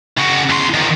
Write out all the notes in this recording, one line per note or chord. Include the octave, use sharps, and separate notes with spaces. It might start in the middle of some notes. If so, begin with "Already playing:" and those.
C#3 F#4
E2 C6
D#3 F3